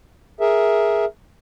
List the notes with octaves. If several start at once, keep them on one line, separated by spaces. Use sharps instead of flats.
G#4 A#4 E5